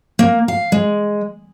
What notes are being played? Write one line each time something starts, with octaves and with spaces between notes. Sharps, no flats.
A#3
F5
G#3